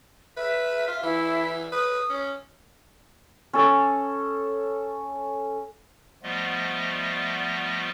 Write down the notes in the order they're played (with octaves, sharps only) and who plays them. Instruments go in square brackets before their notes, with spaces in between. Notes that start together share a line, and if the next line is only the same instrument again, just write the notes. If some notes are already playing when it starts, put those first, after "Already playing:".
[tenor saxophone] B4 [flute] E5
[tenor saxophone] F4
[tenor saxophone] E3 [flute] E4
[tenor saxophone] B4 [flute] D#6
[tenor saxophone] C#4
[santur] C#4 A4
[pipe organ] F3 G3 A3 B3 F4 D#5